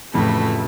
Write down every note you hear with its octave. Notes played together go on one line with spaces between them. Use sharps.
F1 F2 A2 C#3 E3 A3